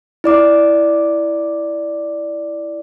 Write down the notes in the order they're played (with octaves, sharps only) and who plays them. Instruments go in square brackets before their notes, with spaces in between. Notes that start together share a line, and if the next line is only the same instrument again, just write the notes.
[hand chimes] E4 D5 D6